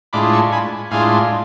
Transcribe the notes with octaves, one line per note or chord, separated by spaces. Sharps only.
A2 G#3 D4 F4 B5 D6
A5 C#6
G#5 B5
A2 G#3 D4 F4 F5 G#5